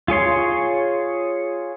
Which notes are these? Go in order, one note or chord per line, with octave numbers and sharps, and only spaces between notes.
F4 G#4 C#5 C6